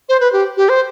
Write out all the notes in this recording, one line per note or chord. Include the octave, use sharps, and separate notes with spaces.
C5
B4
G4
G4
C5